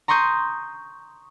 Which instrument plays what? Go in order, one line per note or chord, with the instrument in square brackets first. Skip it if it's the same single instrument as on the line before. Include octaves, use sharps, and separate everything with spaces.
[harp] A#5 C6 C#6 D#6 G6